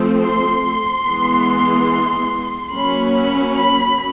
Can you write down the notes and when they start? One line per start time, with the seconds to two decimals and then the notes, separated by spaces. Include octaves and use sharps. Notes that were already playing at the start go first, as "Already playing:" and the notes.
Already playing: F3 A3 C4
0.23 C6
1.07 E3 G#3 B3
2.74 F#3 A#3 C#4 B5
3.16 B5
3.58 B5